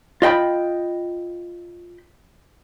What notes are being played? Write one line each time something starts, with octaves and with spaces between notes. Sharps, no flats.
F4 D#5 G5 B5